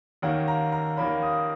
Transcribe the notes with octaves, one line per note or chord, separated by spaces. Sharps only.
D#2 D#3 A#3 C#4 F#5
A#5
A#5
D#2 D#3 A#3 C#4 B5
D#6